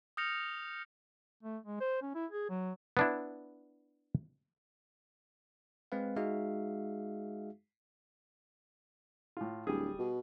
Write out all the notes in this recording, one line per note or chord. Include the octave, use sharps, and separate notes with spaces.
D#6 F6 G6 A#6 C#7 F7
A3
G#3
C5
C#4
E4
G#4
F#3
B3 D4 E4
G#3 C4 B4 F5
G#3 D#4 F#4 G#4 E5 F5
A2 F4
D1 G3 G#4
B2